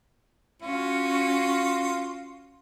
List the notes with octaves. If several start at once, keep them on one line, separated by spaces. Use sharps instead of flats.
C#4 F4 F#4